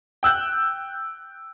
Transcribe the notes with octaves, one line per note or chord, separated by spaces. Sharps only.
G5 E6 F#6 G6